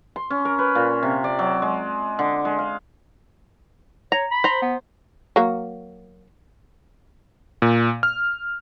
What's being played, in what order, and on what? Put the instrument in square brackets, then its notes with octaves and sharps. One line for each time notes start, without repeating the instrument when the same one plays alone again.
[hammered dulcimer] C6
C#4
A#4
B4
A#2
C3
D5
F#3
G#3
D3
G#3
F5
[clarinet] C#5 [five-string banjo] A#5
[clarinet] B5
[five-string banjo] C5 A#5
[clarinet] B3
[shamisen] F#3 A#3
[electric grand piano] A#2
F6